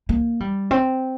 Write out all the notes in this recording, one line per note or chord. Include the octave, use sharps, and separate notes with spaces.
A#3
G3
C4